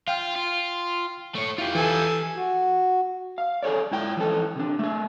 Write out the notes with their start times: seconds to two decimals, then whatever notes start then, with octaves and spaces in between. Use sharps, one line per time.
0.08 F4 F5 G5 F6
0.36 F4
1.35 A3 C#5
1.58 E4 F4 G4
1.75 E3 A4 G#5
2.36 F#4
3.38 F5
3.63 G#4 A4 C#5 D5
3.92 G#2 E4 G5
4.17 E3 F3 A4
4.56 C3 D4
4.79 A3 G#4